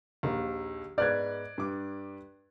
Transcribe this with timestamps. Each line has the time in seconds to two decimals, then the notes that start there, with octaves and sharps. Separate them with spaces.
0.23 A#1 D#2
0.98 G#2 B3 D5 F6 F#6 G#6
1.58 G2 D6